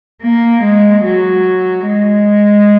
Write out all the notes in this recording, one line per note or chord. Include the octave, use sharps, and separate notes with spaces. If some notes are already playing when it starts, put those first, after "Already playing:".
A#3
G#3
F#3
G#3